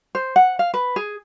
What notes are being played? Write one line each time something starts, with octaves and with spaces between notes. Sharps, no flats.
C5
F#5
F5
B4
G#4